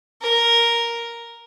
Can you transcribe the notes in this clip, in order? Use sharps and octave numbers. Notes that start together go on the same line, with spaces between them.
A#4